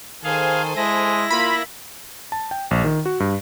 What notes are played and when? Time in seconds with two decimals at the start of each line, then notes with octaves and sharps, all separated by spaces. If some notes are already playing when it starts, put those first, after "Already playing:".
0.24 D#3 G#4 A4 C5 F5 G#5
0.76 G#3 E4 A#6
1.30 A#3 F4 B5
2.32 A5
2.51 G5
2.71 A#1
2.84 D#3
3.06 F#4
3.20 G2